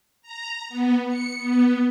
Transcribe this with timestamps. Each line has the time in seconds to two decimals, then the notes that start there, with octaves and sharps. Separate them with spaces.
0.22 A#5
0.69 B3
1.08 C#7
1.38 B3